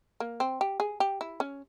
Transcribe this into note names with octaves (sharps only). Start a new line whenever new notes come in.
A#3
C4
G4
G#4
G4
E4
C#4